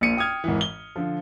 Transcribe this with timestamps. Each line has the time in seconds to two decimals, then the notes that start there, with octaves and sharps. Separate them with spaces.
0.01 A#1 A#2 C#7 D#7
0.17 G5 D#6 F6 G#6
0.44 G#1 E3
0.61 G7
0.96 D3 F3